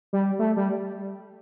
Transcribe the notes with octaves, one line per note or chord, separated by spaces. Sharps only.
G3
A3
G3